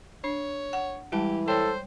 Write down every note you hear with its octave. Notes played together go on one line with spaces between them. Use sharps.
D4 C#5
F#5
E3 G3 G#3 G4 A5
A4 C5 C#5 G5